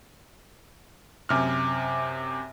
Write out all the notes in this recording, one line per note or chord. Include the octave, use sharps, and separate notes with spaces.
F#2 C3 F6